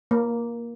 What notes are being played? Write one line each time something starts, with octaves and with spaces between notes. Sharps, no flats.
A#3